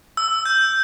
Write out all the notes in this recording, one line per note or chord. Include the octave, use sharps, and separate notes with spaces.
E6
G6